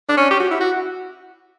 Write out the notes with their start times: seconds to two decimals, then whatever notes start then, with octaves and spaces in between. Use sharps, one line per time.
0.09 D4
0.17 C#4
0.31 G4
0.40 F#4
0.51 E4
0.60 F#4